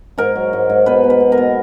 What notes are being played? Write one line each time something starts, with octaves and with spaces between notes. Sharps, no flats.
G#2 A#4
F#3
G#2
G#2
B2 B4
B2
B4
B2
A#4
B2